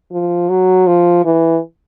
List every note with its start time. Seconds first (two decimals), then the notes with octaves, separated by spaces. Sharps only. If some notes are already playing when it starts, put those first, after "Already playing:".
0.12 F3
0.49 F#3
0.87 F3
1.25 E3